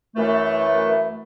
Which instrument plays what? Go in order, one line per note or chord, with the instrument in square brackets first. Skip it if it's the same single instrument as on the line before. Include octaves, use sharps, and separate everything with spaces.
[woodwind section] F#2 E3 A3